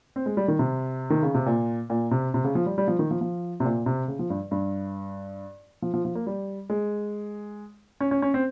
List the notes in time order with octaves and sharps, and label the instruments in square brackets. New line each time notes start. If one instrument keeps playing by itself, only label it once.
[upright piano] C4
G#3
G3
D#3
C3
D#3
C#3
C3
A#2
A#2
C3
C3
C#3
F3
G3
G3
F3
D#3
F3
F3
C3
A#2
C3
C#3
F3
G2
G2
F3
F3
F3
A#3
G3
G#3
C#4
C#4
C#4
C4